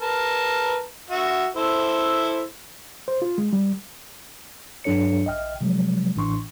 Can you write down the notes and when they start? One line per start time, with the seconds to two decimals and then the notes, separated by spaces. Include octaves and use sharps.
0.01 A#4 B4 A5
1.10 F#4 E5 F#5
1.56 E4 A4 C5
3.08 C5
3.22 F4
3.38 G#3
3.53 G3
4.84 G2 F#3 D4 A4 C#5 C#7
5.25 A#1 D#5 E5 G5 F6
5.61 C3 F3 F#3 G#3
6.15 A1 A2 E3 D4 C6 C#6